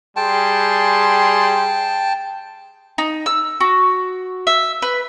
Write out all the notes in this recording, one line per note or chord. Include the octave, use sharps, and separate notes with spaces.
G3 G#4 G5 A5 C6
D#4
E6
F#4
E5
B4